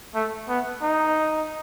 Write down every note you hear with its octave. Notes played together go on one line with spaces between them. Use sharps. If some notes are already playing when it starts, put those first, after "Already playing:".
A3
B3
D#4